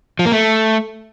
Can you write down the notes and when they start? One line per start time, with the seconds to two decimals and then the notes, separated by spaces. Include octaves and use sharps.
0.19 F3
0.26 A#3
0.32 A3